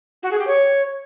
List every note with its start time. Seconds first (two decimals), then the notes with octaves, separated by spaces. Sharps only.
0.22 F#4
0.31 G#4
0.39 G4
0.47 C#5